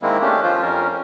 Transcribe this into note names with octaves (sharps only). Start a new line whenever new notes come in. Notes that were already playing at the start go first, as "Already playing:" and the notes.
D#3 G#3 A#3 C4 E4
A3 C#4 D4 G4
F3 F4 C5
F2 C#4 A#4